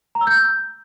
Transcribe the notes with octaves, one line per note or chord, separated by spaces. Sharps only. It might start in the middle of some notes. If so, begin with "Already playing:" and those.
A#5
E6
G6